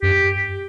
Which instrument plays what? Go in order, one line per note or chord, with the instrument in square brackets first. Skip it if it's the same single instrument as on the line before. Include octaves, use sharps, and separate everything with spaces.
[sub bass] F#2 [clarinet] G4